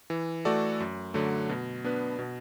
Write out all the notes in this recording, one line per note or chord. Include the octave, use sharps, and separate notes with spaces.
E3
A3 F#4 A4 D5
F#2
D3 F#3 A3
B2
B3 D4 B4
B2